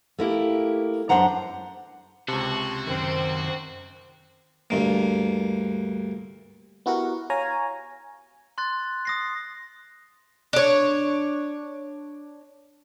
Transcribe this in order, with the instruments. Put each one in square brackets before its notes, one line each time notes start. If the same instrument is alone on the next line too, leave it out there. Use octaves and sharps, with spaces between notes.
[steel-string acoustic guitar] A3 A#3 E4 G4
F#2 G#3 D4 C5 F#5 A#5
[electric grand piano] C#2 C3 [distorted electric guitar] F#4 [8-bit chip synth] A5 C6 C#6
[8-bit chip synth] F#2 D#3 [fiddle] C4 C5
[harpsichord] D2 G2 A#3
[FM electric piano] B3 E4 F#4 G4 A#4 F#5
C#5 F5 G#5 A#5
[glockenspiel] C6 F#6 A6
D#6 A#6 C7
[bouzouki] D4 C#5